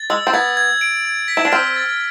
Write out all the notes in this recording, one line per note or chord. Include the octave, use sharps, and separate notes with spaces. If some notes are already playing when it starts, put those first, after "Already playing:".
Already playing: A6
G#3 E6
C4
B3 G#6
G#6
D7
G#6
B6
E4
D4
C4 F6
A6